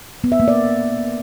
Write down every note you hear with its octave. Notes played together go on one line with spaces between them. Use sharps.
B3
E5
A#3
D5